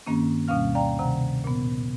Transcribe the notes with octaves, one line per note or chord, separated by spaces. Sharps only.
G2 D#3 A#3 C4 C#4
D2 B2 G3 C#4 F5 F6
D5 F5 G5 A#5
C3 D#3 F#5 A#5
A#2 B3